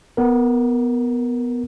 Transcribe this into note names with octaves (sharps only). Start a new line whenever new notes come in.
B3 A#4